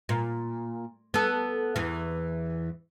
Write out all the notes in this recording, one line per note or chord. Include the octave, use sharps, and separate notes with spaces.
A#2
B3 A4
E2 E3